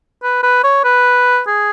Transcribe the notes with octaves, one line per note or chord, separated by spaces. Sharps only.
B4
B4
C#5
B4
G#4